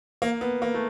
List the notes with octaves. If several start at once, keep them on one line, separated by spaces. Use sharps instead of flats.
A#3
B3
A#3
A3